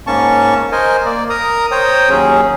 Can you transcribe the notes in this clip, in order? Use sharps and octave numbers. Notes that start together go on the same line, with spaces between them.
G#2 A#3 C#4 A5 C#6
A#4 C5 D#5 G#5
A#3 D5
A#4 A#5 D#6
C5 C#5 G5 A#5 D#6
D#2 F#3 C#4 G#4